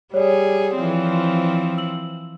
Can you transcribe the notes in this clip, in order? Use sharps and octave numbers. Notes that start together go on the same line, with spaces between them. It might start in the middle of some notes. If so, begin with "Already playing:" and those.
G3 G#4 C#5 D5
E3 F3 C4
E6 F#7